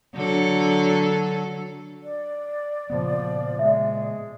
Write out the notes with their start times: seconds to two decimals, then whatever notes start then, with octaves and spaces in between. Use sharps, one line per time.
0.14 D3 F#3 A4
2.03 D5
2.90 A#2 C#3 F3 B3
3.59 G#3 E5